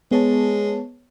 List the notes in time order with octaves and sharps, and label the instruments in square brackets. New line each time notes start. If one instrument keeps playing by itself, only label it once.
[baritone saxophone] G#3 [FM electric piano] B3 C#5 A5